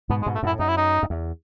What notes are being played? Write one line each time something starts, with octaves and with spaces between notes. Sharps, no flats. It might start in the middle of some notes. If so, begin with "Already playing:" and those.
G#2 B2 B3
G#3
G#2 B2
A3
F#2 A2 E4
F#2 D#4
E4
D#4
F#2
E2